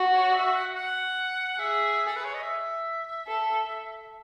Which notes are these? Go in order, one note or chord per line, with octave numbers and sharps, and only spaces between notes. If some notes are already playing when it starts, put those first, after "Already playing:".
Already playing: F#4
C#5
E5
F#5
F#5
G#4 E5
A4
B4
C#5
D#5
E5
A4